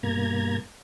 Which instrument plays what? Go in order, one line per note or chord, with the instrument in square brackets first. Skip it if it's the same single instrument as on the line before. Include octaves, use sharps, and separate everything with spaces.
[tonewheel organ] G2 B2 A#3 A#5 G#6